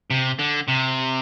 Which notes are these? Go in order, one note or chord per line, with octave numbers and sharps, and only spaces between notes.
C3
D3
C3